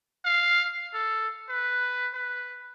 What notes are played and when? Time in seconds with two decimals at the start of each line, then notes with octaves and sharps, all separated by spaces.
0.25 F5
0.94 A4
1.49 B4
2.14 B4